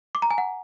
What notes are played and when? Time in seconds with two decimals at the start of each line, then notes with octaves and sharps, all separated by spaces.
0.15 D6
0.22 A#5
0.31 G#5
0.38 F#5